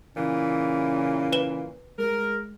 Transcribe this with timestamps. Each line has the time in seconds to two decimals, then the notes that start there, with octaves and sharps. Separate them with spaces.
0.16 A#2 C#3 E3
1.33 B4 E7 G7
1.99 G#3 A#4